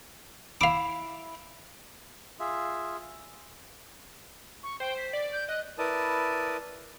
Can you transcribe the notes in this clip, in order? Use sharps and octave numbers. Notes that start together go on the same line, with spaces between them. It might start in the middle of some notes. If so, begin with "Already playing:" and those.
E4 F5 D6
F4 G#4 E5
C#6
C5 G5
B6
D5
G6
D#5 F#6
E4 A#4 B4 D5 A5 D#6